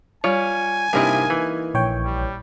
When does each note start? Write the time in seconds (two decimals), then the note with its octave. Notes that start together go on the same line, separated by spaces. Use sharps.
0.24 G3 F4 C#5 G#5
0.93 G2 C3 A#3 D#4 E4
1.30 E3
1.74 A#1 C#5 G5
2.05 G3